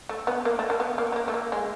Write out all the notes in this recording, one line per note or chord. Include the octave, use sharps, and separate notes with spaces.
A3
B3
A#3
A3
A#3
B3
A#3
B3
A#3
A3
A#3
G#3